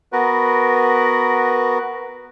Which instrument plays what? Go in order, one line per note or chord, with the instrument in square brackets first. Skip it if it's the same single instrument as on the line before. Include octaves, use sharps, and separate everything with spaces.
[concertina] B3 F#4 A#4 B4